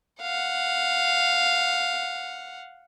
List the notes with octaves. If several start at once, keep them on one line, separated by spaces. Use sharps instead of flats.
F5 F#5